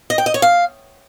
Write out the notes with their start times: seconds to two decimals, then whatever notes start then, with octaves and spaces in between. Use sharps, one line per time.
0.10 D#5
0.18 G5
0.26 D#5
0.34 C#5
0.42 F5